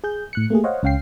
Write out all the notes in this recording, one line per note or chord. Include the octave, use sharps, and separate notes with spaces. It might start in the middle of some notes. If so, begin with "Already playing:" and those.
G#4 G6
A2 F#6 C#7
A3 A#3 G4 G#4
C5 C#5 D#5 F5 F#5
C#2 C#4 F5 G5 C7